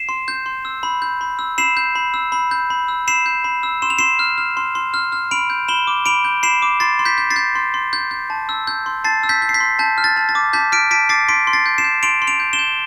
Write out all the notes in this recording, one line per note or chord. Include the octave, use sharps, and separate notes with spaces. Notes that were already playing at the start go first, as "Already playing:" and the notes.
Already playing: C7 E7
C6
G6
C6
E6
B5
G6
B5
E6
B5 C7 E7
G6
B5
E6
B5
G6
B5
E6
B5 C7 E7
G6
B5
E6
C6 E7
F7
C6 C7 E7
F6
F6
C6
C6
F6
F6
B5 D7 F7
G6
B5 E7 G7
D6
B5 D7 F7
G6
B5 C7 E7
D6
C6 A6 C7
C6
G6 B6
G6
A6 C7
G6
C6
C6
G6
G6
A5
E6
G6
C6
A5 A6 C7
E6
G6 B6
G6
C7
G6 B6
C6
A5 G6
F6
A6
A5
A6
D6
A5 G6 B6
F6 B6 D7
A5 B6 D7
D6 A6 C7
C6 B6 D7
C6
A6 C7
G6
C7 E7
G6
C6 D7 F7
C6
D7 F7
G6
E7 G7
G6